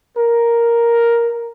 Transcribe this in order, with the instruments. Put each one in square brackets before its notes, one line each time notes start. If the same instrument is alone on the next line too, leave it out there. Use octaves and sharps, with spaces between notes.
[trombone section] A#4